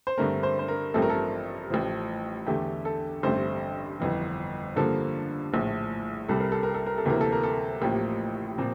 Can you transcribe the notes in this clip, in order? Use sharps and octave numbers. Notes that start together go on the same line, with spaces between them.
C5
G2 D3 A3 C4 A#4
C5
C5
A#4
A1 G2 F3 A3 C4 A4
A#4
A4
A1 A2 F3
E2 D3 A3 G4
A4
A1 G2 D3 A3 C4 C5
G1 F2 E3
G2 D3 F3 A#3 A4
A#1 A2 F3
C2 C3 G3 A4
A#4
A4
A#4
A4
A#4
A4
D2 C3 E3 A#3 A#4
A4
A#4
A4
A1 A2 F3 A#3 G4
A#2 F3 C4